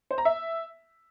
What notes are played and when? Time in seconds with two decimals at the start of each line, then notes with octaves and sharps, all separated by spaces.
0.11 C5
0.18 A#5
0.25 E5